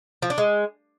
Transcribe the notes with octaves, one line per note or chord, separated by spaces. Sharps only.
F3
D4
G#3